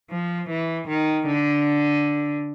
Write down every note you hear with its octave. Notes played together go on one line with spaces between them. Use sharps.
F3
E3
D#3
D3